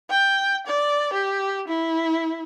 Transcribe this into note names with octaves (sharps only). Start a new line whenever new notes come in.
G5
D5
G4
E4